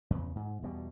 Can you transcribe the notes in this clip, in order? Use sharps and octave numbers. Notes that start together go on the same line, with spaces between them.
E2 C#3
G#2
E2 B2 G3